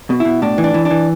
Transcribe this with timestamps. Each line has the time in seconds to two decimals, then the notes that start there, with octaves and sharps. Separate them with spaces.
0.10 B2
0.20 E4
0.25 B2
0.42 A2 D4
0.58 E3
0.64 D4
0.74 E3
0.85 D4
0.90 E3